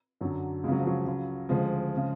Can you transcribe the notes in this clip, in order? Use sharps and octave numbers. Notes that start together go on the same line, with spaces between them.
F#2 D3 F#3
C#2 C#3 F#3 G#3
F3
F#3
C#2 C#3
D2 C#3 F3 G#3
C#3